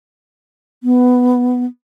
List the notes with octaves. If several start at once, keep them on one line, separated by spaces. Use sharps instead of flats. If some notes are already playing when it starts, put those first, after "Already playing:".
B3